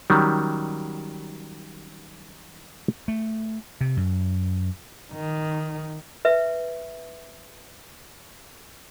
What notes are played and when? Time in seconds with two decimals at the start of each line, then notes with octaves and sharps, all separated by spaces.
0.10 D#3 F#3 G3 C#4
3.08 A3
3.81 C3
3.97 F#2
5.13 D#3
6.25 B4 E5